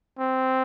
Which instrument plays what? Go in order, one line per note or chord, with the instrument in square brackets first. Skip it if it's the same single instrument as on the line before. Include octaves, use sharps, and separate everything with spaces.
[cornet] C4